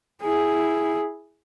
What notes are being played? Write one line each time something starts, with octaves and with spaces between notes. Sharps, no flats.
E4 G#4